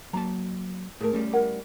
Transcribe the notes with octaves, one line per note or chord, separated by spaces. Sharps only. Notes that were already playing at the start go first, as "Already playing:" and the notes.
F#3 A#3 A5 A#5
A2 A3 G#4 A#4
G3 A3 C#4
E4 A#4 F#5